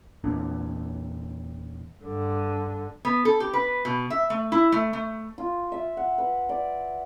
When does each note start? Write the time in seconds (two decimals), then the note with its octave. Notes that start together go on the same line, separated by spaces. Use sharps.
0.24 E2 A#2 D4
2.02 G2 D3
3.05 B3
3.25 A4
3.40 G4
3.53 B4
3.85 B2
4.10 E5
4.30 A3
4.52 E4
4.72 A3
4.93 A3
5.38 F4
5.72 E5
5.97 F#5
6.18 B4
6.49 D5